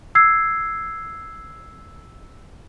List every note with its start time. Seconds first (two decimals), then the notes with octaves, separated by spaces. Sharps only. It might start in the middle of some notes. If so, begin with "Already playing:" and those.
0.15 E6 G#6 C7